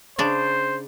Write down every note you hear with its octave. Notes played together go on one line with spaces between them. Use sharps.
C#3 D4 C5